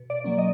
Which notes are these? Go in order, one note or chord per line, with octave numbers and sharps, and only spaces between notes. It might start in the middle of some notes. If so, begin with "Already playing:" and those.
Already playing: B2
D5
F#3 A#3 C#4
D#5